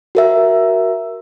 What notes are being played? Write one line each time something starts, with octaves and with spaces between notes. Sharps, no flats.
F#4 A#4 E5